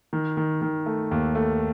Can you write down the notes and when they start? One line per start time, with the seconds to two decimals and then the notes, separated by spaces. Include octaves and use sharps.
0.13 D#3
0.37 D#3
0.62 D#3
0.86 A3
1.11 D#2
1.35 A3